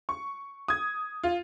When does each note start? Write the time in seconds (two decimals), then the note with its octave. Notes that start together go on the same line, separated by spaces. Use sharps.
0.09 C#6
0.68 D#6 G#6
1.23 F4